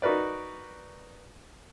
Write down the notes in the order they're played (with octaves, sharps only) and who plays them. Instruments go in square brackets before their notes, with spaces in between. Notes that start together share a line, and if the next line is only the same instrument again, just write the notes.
[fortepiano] D#4 F#4 A#4 B4 D5